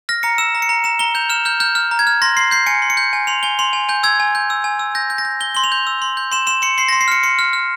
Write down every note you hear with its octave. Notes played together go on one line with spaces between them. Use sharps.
F6 A#6
A#5 C#7
E6 E7
A#5
C#7
A#5
A#5 E7
A#5 G7
G6 F7
F6 E7
F6 G6
F6 G6
F6
A#5
G#6
F6
C6 A#6
C6 C7
G6 C7
G#5 C#7
C6
C#7
G6
G#5
C6 F7
G#5 G7
C6 F7
G#5
G#5 G6
E6 G#6
G#5
G6
E6
G#5
E6
G6 A#6
G6
A#6
G6
G6 G7
C6 G7
F7
G6
E6
C6
G6
C6 E7
C6 E7
C6 C#7
C6 C7
A#6
C6
C7
F6 C#7
C6 C#7
F6
F6